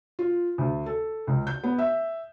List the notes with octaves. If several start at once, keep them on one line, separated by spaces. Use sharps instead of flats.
F4
D2
A4
C#2
G6
B3
E5